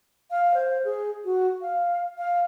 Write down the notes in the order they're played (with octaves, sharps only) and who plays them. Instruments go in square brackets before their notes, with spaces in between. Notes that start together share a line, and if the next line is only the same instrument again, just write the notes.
[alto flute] F5
C5
G#4
F#4
F5
F5